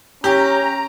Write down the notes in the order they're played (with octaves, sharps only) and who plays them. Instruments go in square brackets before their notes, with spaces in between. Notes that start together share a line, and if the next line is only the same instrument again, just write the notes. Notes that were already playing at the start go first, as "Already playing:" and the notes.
[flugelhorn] C#4 [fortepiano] G4 [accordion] A#5